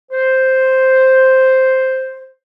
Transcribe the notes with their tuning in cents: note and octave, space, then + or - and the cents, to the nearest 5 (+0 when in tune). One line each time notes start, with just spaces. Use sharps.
C5 +0